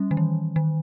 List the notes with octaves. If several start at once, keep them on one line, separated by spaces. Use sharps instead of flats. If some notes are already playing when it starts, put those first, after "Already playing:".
Already playing: G3 C#4
D#3
E3
D#3